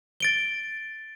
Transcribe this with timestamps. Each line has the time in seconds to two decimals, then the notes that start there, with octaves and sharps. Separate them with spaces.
0.20 A6 D7 G7